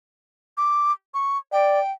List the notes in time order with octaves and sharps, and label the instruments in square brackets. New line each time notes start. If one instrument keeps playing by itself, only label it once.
[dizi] D6
C#6
[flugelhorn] D5 [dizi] G5